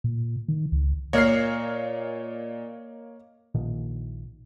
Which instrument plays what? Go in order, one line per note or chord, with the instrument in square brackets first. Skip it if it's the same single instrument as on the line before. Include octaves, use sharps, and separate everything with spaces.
[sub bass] A#2
D#3
C#2
[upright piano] A#2 F6 C7 [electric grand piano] A#3 C#5 [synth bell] A#4 D#5 F5
[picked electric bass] A#1 A#2 D#3